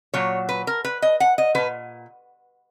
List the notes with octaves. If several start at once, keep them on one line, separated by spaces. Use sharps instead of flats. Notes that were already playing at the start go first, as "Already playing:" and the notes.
A#2 F#3 C#5
B4
A#4
B4
D#5
F#5
D#5
A#2 F#3 B4